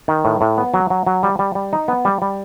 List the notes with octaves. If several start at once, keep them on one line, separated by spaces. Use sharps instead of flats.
D#3
A2
A2
B3
F#3
F#3
F#3
G3
G3
G3
D#4
B3
G3
G3